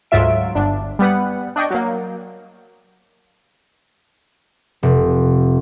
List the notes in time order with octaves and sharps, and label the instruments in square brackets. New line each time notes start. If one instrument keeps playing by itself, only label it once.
[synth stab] D2 G#2 F#3 F4 E5 D7
G1 D4
G3 B3 B4 F#5
D4 D5 D#5 G5 C#6
F#3 A#3
[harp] F1